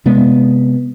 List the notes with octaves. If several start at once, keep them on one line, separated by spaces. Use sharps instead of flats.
C3 G#3 B3